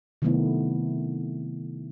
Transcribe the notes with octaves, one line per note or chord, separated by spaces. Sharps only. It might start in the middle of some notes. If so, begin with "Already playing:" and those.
C3 D#3 F#3 A3 B3 E4